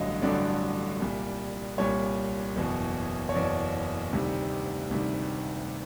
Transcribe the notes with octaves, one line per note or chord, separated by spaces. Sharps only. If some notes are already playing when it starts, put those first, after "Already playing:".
Already playing: A1 G2 D3 F#3 A3 D#5 F5
A1 G2 D3 F#3 A3 D5
C2 A#2 G3
C2 A#2 G3 C#5
F#1 E2 B2
C#5
F#1 E2 B2 D5
D2 C3 D#3 G3
D2 C3 D#3 G3